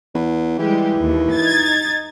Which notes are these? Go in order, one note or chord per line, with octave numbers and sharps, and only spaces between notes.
E2
E3 G3 G#3 G4
D#2
D#4 G#6 A6